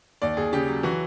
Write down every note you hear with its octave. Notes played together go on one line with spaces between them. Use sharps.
D#2 D5
D#2 G#4
C#3 G4
F#3
E3 F#4